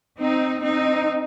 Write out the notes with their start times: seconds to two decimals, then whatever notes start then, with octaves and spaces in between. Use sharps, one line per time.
0.20 C4 D#4
0.62 C4 D#4